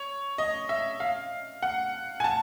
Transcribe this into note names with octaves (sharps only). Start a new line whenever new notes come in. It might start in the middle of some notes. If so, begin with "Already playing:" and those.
Already playing: C#5
D#5
E5
F5
F#5
G#5
A5